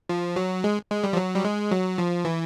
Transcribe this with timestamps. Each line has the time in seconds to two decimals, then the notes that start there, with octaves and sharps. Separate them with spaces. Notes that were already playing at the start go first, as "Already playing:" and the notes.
0.09 F3
0.36 F#3
0.64 G#3
0.91 G#3
1.04 G3
1.13 F3
1.17 F#3
1.35 G3
1.44 G#3
1.71 F#3
1.98 F3
2.25 E3